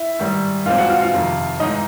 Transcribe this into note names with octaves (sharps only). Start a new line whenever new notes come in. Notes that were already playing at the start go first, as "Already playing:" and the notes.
Already playing: E4 E5
G#2 D#3 G3
A#2 F3 G#3 C4 F4 F5
F#4 F#5
F4 F5
F4 F5
F2 C3 D#3
G#2 E3 G#3 D#4 D#5